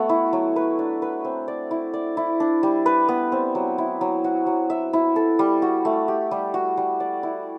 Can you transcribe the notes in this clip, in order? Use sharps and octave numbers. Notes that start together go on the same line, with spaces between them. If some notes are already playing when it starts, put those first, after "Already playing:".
Already playing: A3 B3 F#4
E4
F#3
B4
D4
B4
C4
D5
E4
D5
E4
D4
G3
B4
B3
C4
F#3
E4
F#3
F#4
F#3
E5
E4
A4
G3
F#4
A3
G4
G3
F#4
G3
D5
E4